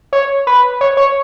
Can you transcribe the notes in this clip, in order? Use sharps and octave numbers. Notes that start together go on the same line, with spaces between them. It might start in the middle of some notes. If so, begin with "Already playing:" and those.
C#5
B4
C#5
C#5